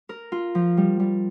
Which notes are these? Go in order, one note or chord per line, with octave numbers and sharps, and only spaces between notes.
A#4
F4
F3
G3
G3